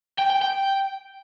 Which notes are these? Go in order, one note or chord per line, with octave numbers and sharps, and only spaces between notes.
G5
G5
G5